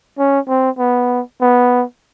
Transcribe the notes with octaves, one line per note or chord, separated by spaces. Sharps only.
C#4
C4
B3
B3